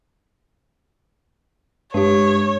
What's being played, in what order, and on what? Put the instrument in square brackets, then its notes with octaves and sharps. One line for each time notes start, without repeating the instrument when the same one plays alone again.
[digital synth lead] G2 [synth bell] G#3 G4 [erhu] C#5